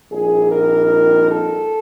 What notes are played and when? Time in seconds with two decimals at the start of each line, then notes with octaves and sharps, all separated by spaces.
0.11 A#1 A#2 G3 C4 D#4 G#4
0.50 A#4
1.29 A4